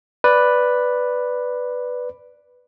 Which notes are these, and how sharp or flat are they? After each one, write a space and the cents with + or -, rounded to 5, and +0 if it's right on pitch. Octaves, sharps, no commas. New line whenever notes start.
B4 +0 D5 +0